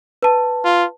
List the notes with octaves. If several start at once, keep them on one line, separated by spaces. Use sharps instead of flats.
B4 A5
F4